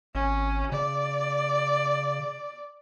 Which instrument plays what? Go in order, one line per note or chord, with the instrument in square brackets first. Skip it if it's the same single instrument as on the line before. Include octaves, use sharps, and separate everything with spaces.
[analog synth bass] G#1 [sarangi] C#4
[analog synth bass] C#3 [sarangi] D5